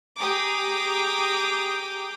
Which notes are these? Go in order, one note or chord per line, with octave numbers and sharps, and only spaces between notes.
G4 G#4 G5 A#5 D6 D#6